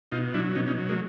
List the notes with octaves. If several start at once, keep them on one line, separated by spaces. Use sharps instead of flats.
B2 D#4 F4
F#3 D4 E4
B2 C#4 D#4
C#4 D#4
F#3
G#3 A#3